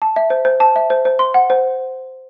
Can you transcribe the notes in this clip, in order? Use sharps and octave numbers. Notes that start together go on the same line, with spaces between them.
A5
E5
C5
C5
A5
E5
C5
C5
C6
F#5
C5